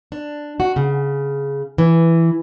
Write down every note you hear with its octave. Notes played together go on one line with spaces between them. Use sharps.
D4
F#4
C#3
E3